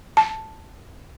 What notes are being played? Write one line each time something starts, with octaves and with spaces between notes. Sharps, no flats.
A5